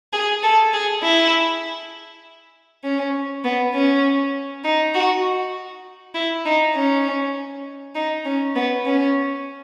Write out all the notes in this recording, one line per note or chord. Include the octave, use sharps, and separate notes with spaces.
G#4
A4
G#4
E4
C#4
B3
C#4
D#4
F#4
E4
D#4
C#4
D#4
C#4
B3
C#4